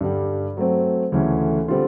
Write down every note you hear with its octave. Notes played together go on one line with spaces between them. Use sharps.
G2 D3 G3
F#3 A3 C4
D2 C#3 E3 A3 C#4
D3 G3 C4 F4